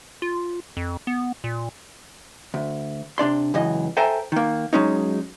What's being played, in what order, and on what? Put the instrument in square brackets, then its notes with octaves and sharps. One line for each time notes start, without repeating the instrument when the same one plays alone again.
[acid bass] F4
F2
B3
A#2
[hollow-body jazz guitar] D2
C3 D4 D5 C6
C#2 F#2 E3 D#5
A4 C5 E5 G5 G#5 A#5
D#3 A#3
F#3 G#3 C#4 D#4